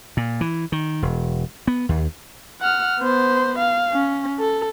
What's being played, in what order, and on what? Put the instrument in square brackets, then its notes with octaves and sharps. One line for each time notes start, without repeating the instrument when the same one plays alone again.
[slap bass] A#2
E3
D#3
E1
B3
D#2
[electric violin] F#5 F6
B3 C5
F5
C#4
A4